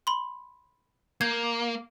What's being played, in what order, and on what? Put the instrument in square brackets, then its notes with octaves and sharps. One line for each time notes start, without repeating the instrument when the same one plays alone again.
[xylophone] B5 C6
[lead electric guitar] A#3 [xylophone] G6 G#6